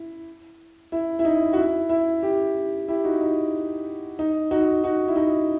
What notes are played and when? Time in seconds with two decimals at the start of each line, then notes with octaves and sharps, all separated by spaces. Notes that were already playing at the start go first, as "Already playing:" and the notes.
Already playing: E4
0.92 E4
1.19 E4
1.25 D#4
1.53 F#4
1.57 E4
1.89 E4
2.23 E4 G4
2.88 E4 G4
3.04 D#4 F#4
3.21 D#4
4.19 D#4
4.51 D#4 F#4
4.84 D#4 F#4
5.08 E4
5.16 D#4 F#4